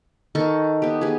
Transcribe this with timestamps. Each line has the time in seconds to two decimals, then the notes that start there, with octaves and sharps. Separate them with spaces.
0.35 D#3 A4 A5 C#6
0.82 B3 G4
1.01 B3 G4 G#4